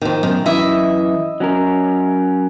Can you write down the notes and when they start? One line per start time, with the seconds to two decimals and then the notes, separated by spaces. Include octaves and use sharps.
0.02 F2 D#3
0.23 F#2 B2 D#3
0.46 F#2 E3 E4 D#5 E5
1.40 F#3 C#4 A#4